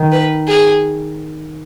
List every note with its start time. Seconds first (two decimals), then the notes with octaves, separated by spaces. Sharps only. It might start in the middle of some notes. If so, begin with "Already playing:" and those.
Already playing: D#3
0.12 B4
0.47 G#4